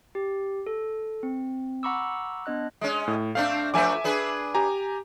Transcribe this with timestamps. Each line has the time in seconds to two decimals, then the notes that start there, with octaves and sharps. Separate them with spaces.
0.15 G4
0.66 A4
1.23 C4
1.83 F#5 A#5 B5 C#6 D6 E6
2.46 B3 D4 D#5 F#6
2.81 G#3 C#4
3.08 A2
3.35 A3 C4 D4 F5
3.74 F3 A3 B4 E5 G#5 D6
4.04 D4 G#4 B4
4.55 G4 G#5 A#5